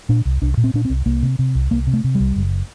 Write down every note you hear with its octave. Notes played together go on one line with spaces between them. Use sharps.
A#2 D4
C2
C2 D4
A#2
C4
A#2 D4
C4
C2
C2 A#3
C3
C3
C2
C2 A#3
C3
A3
C3
G3
C2
F#1